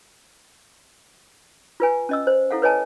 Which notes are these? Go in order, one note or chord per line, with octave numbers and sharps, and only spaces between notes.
F4 B4 G#5
C#4 D#5 E6
C5
E4 A4 F5 F#5
B4 C#5 D#5 G#5 A5